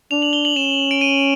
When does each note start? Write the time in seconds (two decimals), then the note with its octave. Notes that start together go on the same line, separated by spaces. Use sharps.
0.11 D4 F7
0.22 F#7
0.33 G7
0.45 F#7
0.56 C#4 E7
0.91 D7
1.01 D#7